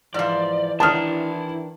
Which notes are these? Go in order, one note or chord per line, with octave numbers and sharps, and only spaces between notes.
G#2 E3 F3 D5
D#3 D4 E4 A5 A#5 D#6 F6